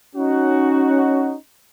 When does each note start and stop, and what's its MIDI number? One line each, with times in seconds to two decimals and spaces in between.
0.16 1.35 61
0.16 1.35 63
0.16 1.35 66